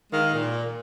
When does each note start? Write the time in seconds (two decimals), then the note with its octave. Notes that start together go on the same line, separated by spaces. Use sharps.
0.13 D#3 G#3 F5
0.33 A#2